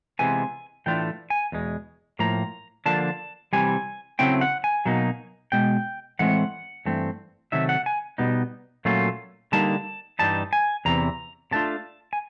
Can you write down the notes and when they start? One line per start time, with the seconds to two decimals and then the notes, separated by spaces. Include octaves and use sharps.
0.19 C3 E3 G#3 B3 G#5
0.86 A2 E3 A3 D4 F4 G5
1.30 G#5
1.52 E2 B2 G#3
2.19 A2 F3 A#3 A#5
2.86 D3 F3 A#3 D4 F4 A5
3.53 C3 E3 G3 G#5
4.19 C#3 F#3 A3 C4 E4 G5
4.41 F#5
4.64 G#5
4.85 B2 F#3 A#3 D#4
5.52 B2 G#3 G5
6.19 A2 E3 G#3 C4 F#5
6.86 G2 E3 A3 C4
7.52 C3 D#3 F#3 A3 E5
7.69 F#5
7.86 G#5
8.18 B2 G3 B3 D#4
8.85 A#2 F#3 A3 C#4 F4
9.52 D3 G3 A#3 D#4 A5
10.19 G2 E3 G3 D#4 A5
10.53 G#5
10.85 E2 C3 E3 A#5
11.51 C3 E3 A3 D4 F4 A5
12.13 G#5